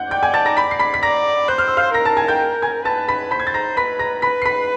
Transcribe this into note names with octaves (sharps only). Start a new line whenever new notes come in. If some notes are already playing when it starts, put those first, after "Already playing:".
Already playing: F#5 F#6 G6
D5 G5 G6
G#5 G#6
A5 A6
A#5 A#6
B5 B6
C7
B5 B6
B6
D5 A#5 A#6
C5 F#6
F6
E6
F5 F6
A#4 A#5 A#6
A5 A6
G#5 G#6
G5 G6
G#5 G#6
B4 A5 A6
B5 B6
C5 B5 B6
G#6
A6
A#5 A#6
B4 B5 B6
A#5 A#6
B4 B5 B6
C7
B5 B6